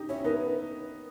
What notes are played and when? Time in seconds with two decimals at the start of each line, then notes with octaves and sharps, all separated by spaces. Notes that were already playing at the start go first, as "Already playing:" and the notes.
Already playing: D#4 G4
0.09 C#4 E4 C#5
0.19 E4
0.24 B3 D#4 A#4
0.41 B4